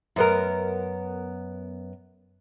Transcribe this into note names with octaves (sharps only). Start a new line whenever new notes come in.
F#2 B3 A#4